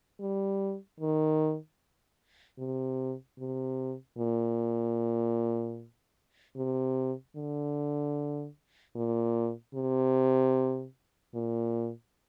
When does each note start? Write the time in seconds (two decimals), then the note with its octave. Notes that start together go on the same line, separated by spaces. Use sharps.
0.20 G3
1.00 D#3
2.59 C3
3.39 C3
4.18 A#2
6.57 C3
7.36 D3
8.96 A#2
9.75 C3
11.34 A#2